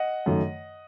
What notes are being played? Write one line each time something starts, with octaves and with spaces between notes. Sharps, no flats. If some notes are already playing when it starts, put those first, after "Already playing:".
Already playing: D#5 F#5
F#2 D#3 A3